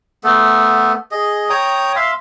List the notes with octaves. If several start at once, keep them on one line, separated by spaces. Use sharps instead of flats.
A3 B3 A4
G#4 D#5
C#5 G5 A#5 D#6
E5 F5 C6